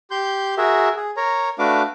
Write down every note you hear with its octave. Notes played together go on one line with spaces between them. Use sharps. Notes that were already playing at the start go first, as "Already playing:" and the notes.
G4 C6 G6
F#4 G#4 A#4 E5
G#4
A#4 C#5 A#5
A3 D4 F#4 B4 F5 D6